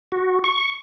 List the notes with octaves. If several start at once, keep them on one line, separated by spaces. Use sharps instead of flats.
F#4
C#6